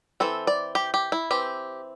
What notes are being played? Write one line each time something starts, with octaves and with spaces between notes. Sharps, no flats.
E3 C4 A4
D5
G4
G4
E4
E3 C4 G4